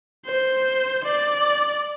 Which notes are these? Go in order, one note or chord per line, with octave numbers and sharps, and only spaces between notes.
C5
D5